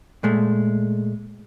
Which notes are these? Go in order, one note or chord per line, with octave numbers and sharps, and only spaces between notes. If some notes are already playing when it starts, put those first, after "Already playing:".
A#2 G#3 A3